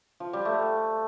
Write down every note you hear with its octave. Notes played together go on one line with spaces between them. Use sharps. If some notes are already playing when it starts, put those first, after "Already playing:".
F3
G3
A3